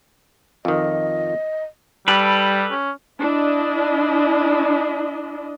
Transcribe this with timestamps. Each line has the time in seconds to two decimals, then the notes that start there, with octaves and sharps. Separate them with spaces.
0.65 F2 D#3 D#5
2.08 G3 G4 A4 B4
2.71 C#4
3.20 D4 E4 D#5